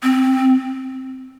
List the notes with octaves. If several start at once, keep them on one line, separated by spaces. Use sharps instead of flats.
C4